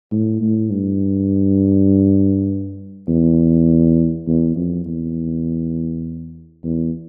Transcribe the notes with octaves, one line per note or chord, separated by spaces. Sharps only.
A2
A2
G2
E2
E2
F2
E2
E2